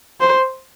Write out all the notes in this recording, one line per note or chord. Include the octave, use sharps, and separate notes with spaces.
C5